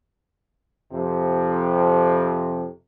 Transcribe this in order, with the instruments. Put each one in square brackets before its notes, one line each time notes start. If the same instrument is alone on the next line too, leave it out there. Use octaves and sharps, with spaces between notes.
[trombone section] F2 C3